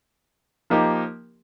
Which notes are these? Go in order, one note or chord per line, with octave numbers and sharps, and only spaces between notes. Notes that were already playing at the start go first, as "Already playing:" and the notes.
F3 A#3 D#4 G4